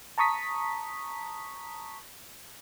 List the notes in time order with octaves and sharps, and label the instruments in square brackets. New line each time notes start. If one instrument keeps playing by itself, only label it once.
[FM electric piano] A5 A#5 C#6 D#6 B6